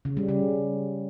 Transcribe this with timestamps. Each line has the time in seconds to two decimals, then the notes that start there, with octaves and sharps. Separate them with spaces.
0.05 C#3
0.17 G3
0.29 C#3